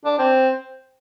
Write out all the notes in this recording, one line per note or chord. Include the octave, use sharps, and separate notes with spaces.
D4
C4